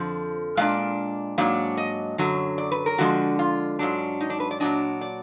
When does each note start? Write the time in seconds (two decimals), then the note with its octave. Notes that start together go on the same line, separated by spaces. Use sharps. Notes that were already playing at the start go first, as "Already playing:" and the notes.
Already playing: F2 D3 F3
0.57 A#2 G#3 D4 F5
1.38 G#2 F#3 A#3 D4
1.77 D#5
2.18 F#2 D3 F#3
2.58 D5
2.72 B4
2.86 A#4
2.98 D3 F3 G#3 D4 F#4
3.39 F4
3.79 G#2 F#3 D4
4.20 D#4
4.30 D4
4.40 B4
4.51 D5
4.60 A#2 F#3 D4 D#5
5.01 D5